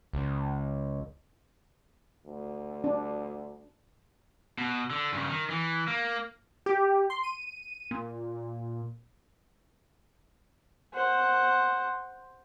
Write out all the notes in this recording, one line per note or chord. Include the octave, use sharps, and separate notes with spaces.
C#2
D2
D4
B2
D3
G2 C#3
D#3
E3
A#3
G4
C6
D#7
A#2
C5 F#5